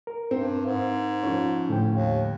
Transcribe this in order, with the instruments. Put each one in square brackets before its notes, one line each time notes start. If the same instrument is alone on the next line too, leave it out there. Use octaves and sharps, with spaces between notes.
[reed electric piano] A#4
[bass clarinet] G2 [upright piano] C4
[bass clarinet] G#2
[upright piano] F3 C#4
[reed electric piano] A2 D3 G5
[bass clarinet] D#2